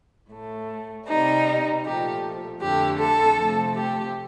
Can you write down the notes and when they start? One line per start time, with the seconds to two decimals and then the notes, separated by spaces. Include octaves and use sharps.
0.32 A2 A3
1.08 C3 G3 D#4
1.84 A#2 F3 A3 G4
2.61 F2 D3 A3 G4
3.00 A4
3.38 C3 F3 A3
3.76 G4